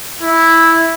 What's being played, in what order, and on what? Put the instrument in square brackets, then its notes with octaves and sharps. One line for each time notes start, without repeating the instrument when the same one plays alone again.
[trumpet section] E4